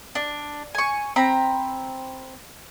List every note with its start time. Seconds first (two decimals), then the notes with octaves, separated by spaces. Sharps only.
0.15 D4
0.75 G#5 C#6
1.16 C4 A#5 B5